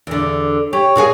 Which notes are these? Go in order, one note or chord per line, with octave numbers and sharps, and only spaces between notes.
E2 D3
G4 C#5
A#2 F#4 G#4